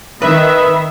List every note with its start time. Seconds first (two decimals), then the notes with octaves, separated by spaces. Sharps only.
0.22 D#3 B4 E5 B5 D#6